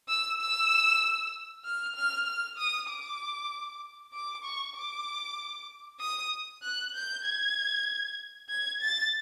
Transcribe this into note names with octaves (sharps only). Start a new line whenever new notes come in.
E6
E6
F6
F6
F6
D#6
D6
D6
C#6
D6
D#6
F#6
G6
G#6
G#6
A6